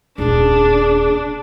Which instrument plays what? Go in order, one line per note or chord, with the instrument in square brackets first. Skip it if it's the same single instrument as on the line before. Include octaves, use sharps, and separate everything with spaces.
[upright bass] D#1 A#2 [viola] D4 [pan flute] G#4